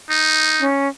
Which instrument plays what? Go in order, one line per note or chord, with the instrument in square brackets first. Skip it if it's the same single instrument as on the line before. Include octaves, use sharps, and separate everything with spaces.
[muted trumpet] D#4
[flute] C#4